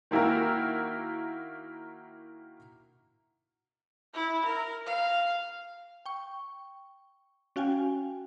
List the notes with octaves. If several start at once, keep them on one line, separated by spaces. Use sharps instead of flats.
D#3 A#3 E4 F#4 A#4
E4
A#4
F5
G5 C#6
C#4 F#4 F5 G5 G#5